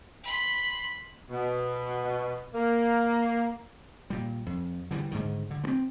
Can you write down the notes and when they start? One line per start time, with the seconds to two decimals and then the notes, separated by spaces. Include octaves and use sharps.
0.23 B5 C6
1.30 B2
2.54 A#3
4.10 A#2 G3
4.46 F2
4.91 D3 E3 F3 G3
5.11 G#2 D3 D#3
5.51 D3
5.64 G#3 C4